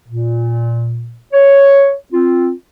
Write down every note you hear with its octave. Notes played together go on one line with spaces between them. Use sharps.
A#2
C#5
C4 F4